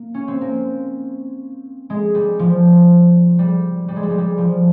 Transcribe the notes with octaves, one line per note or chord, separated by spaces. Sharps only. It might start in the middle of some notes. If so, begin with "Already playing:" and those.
Already playing: A#3
C#4
C4
A#3
G#3
G3
F3
G3
G3
G#3
G3
G#3
G3
F3